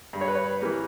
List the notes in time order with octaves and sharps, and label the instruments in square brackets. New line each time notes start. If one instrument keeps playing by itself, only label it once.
[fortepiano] G2
C#5
B4
C#5
E3 G3 A#3